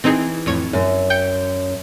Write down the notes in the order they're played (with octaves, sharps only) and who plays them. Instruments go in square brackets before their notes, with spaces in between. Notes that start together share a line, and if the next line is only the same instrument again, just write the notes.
[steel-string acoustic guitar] E3 [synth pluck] C4 D#4 G#4
[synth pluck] F2 A2 C#5
[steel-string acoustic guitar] F#2
[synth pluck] G5 G6 C#7